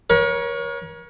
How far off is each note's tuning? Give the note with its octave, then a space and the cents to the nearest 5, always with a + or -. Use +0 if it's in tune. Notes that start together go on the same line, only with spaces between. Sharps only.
A#4 +40 C#5 +0